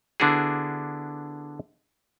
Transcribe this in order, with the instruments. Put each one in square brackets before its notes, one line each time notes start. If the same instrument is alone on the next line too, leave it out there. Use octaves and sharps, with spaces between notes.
[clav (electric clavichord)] D3 B3 D4 E4 F#4 G#4